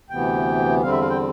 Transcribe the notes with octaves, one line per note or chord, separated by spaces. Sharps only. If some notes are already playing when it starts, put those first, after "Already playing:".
D2 C3 E3 B3 G5
E2 D3 G3 C4 F5
E5
F5
G5